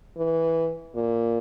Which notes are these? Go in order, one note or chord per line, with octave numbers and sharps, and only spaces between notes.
E3
A#2